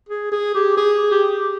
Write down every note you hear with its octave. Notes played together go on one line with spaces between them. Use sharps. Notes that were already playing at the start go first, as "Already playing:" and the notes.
G#4
G#4
G4
G#4
G4